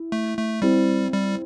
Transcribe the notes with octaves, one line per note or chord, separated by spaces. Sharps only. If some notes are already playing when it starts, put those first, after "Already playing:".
Already playing: E4
A3
A3
G3 C4 E4
G3